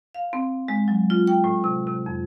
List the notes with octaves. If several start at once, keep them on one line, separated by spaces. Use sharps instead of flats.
F5
C4
G#3
F#3
F4
G5
A2
C3
C3
F2